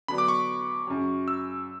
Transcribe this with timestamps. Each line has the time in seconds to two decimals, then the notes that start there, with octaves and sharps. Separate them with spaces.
0.08 D3 F#3 B3 D4 B5
0.18 D6
0.28 C#6
0.87 F#2 C#3 F#3
1.28 E6